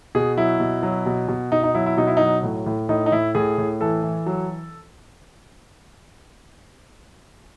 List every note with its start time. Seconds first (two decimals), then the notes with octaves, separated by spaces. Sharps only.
0.15 B2 G#4
0.37 F#3 E4
0.60 B2
0.83 F#3
1.06 B2
1.28 B2
1.52 B2 D#4
1.63 D#4
1.74 F#3 E4
1.86 E4
1.97 B2 D#4
2.07 E4
2.17 F#3 D#4
2.43 A2
2.66 A2
2.89 A2 D#4
3.06 D#4
3.12 A2 E4
3.35 A2 G#4
3.58 A2
3.81 E3 A4
4.03 E3
4.26 F#3